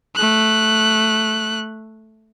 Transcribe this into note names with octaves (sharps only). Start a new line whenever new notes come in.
A3 F#6